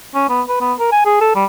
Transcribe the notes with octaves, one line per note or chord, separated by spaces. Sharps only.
C#4
B3
B4
B3
A#4
G#5
G#4
A4
G3